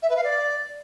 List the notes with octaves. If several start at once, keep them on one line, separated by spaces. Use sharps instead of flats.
E5
B4
F5
D5